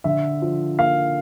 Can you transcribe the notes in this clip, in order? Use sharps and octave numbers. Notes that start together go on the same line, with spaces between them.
D3 E5
F3
A#3 F5